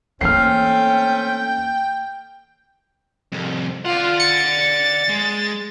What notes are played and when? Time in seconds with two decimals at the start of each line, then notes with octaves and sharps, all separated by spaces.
0.21 E3 A3 A#3 C4 C#4 G5 F6 C7
3.32 C2 F2
3.85 F4 D5 F#5
4.20 A6 C#7
5.09 G#3